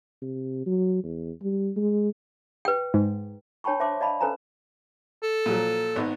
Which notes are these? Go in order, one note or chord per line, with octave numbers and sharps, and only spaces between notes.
C3
F#3
E2
G3
G#3
B4 G5
G#2
D4 C#5 G5 A5 B5 C#6
C5 E5 A5 C6 D6
D5 D#5 F5 A5 B5
C#4 A4 B4 C5 G#5 A#5
A4
A#2 F3 F#3
G#1 B3 D#4